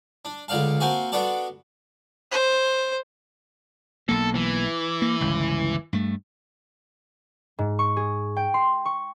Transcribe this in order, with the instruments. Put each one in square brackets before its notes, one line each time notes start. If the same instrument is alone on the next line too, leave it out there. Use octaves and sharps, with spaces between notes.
[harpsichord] D4
C#2 D3 D5 F5 A5
A#3 C4 F#4 G#5 A5
B3 D4 F#4 A4 D5 A5
[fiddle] C5
[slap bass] B1 A#3 [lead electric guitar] A4
[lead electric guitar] E3
[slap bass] A#3
G1 C#2
G2 A3
[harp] G#2
C#6
G#4
G5
C6
C#6